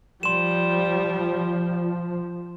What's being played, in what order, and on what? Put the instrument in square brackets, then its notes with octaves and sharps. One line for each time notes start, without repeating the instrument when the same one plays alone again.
[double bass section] F3 [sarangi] G3 [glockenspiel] C6 E7